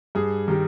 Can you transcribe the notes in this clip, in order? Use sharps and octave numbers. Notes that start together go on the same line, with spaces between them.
G2 G#4
D#3 G3